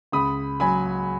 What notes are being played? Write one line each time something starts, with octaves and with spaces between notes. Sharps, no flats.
C#2 B5 D#6
F#3 G#5 B5